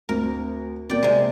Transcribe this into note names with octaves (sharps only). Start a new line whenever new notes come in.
D2 C4 A#4
B2 A#3 D5 G5
C3 G#3